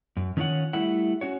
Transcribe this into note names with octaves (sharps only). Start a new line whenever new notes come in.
F#2
D#3 C#4 D4 F4 C#5 F#5
G3 A3 E4 E5 F#5
C#4 F#4 C#5